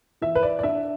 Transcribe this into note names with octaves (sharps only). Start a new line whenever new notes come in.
E3 E5
B4
D5
D5
D4 E5